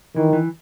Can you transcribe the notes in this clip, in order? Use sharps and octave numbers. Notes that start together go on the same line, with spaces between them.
D#3 E3
E3